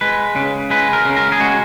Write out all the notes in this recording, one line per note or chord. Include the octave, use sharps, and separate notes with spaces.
G#3 B4
C#3
G#3 B4
A#4
C#3
A#4
G#4
G#3 F#4